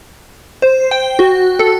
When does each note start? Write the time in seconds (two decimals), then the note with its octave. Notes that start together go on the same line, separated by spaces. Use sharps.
0.62 C5
0.91 G5
1.19 F#4
1.59 A4